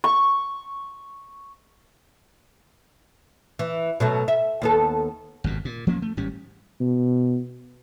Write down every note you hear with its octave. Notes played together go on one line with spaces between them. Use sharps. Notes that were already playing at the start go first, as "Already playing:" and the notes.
C#6
E3
B2 F#3 A3
E5
D#2 B3 A4
G#1 F2 B2
A#2
F3 A#3 C#4
A3
G#1 A2 G3 C#4
B2